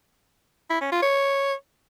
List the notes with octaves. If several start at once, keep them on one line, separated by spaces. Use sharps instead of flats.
E4
C#4
F4
C#5